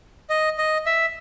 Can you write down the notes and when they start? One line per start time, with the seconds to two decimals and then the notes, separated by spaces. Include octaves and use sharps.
0.30 D#5
0.58 D#5
0.86 E5